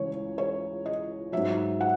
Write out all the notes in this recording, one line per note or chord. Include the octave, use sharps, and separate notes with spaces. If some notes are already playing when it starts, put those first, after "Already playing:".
Already playing: C#2 C#3 E3 C#5
C#5
D#5
G#2 F#3 E5
F#5